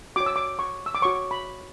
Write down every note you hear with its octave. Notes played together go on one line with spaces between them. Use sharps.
F#4 C#5 D6
E6
D6
C#6
E6
D6
F#4 C#5 C#6
B5